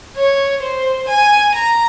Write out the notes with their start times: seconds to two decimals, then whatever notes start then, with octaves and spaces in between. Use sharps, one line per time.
0.17 C#5
0.63 C5
1.09 G#5
1.55 A#5